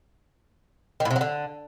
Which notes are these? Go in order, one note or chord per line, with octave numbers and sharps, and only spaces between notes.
D#3
A2
C3
F#3
D3